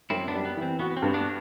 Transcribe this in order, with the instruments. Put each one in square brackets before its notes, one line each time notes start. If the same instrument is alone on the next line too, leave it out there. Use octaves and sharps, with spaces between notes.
[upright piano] F#2 [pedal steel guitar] C4 E4
[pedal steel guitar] B3 D4
[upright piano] G3
[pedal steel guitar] B3
[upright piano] E3
[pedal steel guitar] C4
[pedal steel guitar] B3 [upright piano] F#4
[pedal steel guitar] B3
C4
[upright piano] G2
[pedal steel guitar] B3 D4